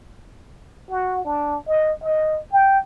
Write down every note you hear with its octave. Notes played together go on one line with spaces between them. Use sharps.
F#4
D4
D#5
D#5
G5